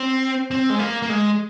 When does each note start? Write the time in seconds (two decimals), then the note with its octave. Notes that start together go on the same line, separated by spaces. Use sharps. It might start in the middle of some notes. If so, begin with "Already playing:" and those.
Already playing: C4
0.51 C4
0.70 G#3
0.79 A#3
1.02 A#3
1.10 G#3